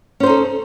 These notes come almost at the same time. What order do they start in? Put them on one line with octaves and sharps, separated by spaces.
C#4 C5 D#4 A4